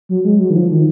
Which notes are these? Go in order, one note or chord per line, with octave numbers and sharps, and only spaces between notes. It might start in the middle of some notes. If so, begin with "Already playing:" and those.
F#3
G#3
F#3
D#3
F3
D#3